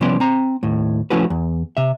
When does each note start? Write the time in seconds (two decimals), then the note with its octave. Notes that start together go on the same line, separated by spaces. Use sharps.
0.01 C2 F3 B3 C#4 D5 C6
0.20 C4 A#5
0.63 D#2 A2
1.10 F3 A3 C#4 E4 F#4 B4
1.30 E2
1.77 C3 E5